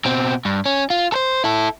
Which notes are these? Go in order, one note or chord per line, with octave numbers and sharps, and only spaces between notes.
B2 C4
G2
C#4
F4
A4 C5
E4 A4